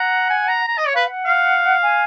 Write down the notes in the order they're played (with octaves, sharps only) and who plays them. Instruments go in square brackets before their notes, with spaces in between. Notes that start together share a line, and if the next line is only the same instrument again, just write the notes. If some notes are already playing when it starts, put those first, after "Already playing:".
Already playing: [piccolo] F#5 [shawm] A#5
[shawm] G#5
A#5
A#5
D#5
C#5
[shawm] B4 [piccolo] F5
[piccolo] F#5
[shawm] F5
[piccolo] G#5